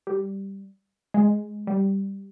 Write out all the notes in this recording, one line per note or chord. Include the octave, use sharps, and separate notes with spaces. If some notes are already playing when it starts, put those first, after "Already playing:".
G3
G#3
G3